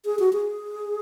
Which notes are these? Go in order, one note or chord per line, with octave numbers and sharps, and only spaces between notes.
G#4
F#4
G#4